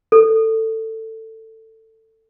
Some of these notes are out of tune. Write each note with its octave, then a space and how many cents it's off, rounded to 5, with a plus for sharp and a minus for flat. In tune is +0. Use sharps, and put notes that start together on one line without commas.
A4 +15